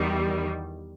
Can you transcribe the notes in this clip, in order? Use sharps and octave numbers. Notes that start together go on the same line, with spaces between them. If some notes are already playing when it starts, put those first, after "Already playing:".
Already playing: E2 D#3 G3